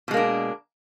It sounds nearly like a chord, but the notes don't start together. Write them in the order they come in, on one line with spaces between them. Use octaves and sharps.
B2 G#3 A#3 D4